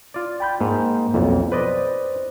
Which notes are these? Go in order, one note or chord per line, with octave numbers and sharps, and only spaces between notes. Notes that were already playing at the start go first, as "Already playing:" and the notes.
F4 D5
G5 B5 G6
G#2 A#3
B1 F2
B4 C5 D5 D#5